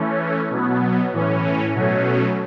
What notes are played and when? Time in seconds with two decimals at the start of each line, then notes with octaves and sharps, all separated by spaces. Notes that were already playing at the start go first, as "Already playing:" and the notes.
Already playing: E3 A3 C#4
0.50 B2 F#3 B3
1.13 A2 E3 C#4
1.74 B2 F#3 A3 C#4